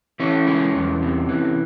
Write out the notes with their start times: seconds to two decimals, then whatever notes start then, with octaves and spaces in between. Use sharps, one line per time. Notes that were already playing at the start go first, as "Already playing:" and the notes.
0.20 E3 C#4
0.47 G#3
0.75 E2
1.02 C3
1.29 E3